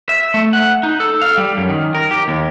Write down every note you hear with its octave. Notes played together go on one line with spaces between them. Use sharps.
E5
A3
F#5
D#4
A4
F5
G3
F#2
D#3
A#4
G4
D#2